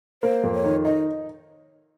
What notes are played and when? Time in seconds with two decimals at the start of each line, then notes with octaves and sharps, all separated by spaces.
0.23 A#3 C5
0.44 F2
0.54 C#5
0.64 D#3
0.85 D#4 D#5